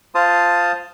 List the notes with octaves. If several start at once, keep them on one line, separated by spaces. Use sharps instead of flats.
F4 C5 A5 D#6